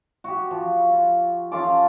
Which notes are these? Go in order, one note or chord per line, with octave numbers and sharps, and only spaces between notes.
F#4 G4
F3
F4
C#4 F4 A4 D6